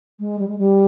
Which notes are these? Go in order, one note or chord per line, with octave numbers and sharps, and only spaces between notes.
G#3
G3
G#3
G3